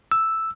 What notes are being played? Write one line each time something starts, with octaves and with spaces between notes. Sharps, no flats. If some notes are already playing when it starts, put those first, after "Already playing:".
E6